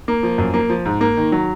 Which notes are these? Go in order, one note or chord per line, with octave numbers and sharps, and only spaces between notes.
A#3
F3
F#2
A#3
F3
G#2
A#3
D#3
F#3